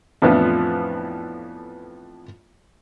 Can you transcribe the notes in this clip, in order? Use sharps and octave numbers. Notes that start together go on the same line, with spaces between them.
F2 A2 E3 F3 B3 D4